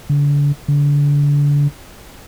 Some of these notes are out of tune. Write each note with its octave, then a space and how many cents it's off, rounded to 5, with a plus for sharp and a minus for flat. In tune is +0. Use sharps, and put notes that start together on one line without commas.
D3 -35
D3 -30